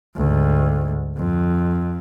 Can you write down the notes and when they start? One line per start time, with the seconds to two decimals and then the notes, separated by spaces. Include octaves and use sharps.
0.17 D2 G#2
1.17 F2